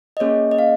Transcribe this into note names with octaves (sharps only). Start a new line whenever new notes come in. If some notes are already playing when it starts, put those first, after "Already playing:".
D#5
A#3 C#4 G#4 C#5
D#5
F5